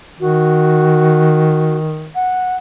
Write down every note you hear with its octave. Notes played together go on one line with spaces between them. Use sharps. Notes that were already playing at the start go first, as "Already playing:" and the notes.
D#3 F#4
F#5